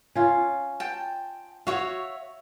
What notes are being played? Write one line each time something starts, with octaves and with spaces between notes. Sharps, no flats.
C#4 F4
G5 A5
F#4 C#5 E5 F5